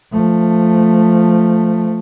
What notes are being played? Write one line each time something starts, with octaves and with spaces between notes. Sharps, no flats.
F3 A3